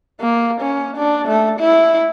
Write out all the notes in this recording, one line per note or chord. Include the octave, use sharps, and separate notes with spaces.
A#3
C#4
D4
A3
E4